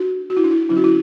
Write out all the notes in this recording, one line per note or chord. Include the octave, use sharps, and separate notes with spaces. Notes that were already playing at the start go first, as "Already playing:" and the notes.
Already playing: D4 F#4
F#4
E4
D4
E4
D3 F#3 C#4 E4
F#4
E4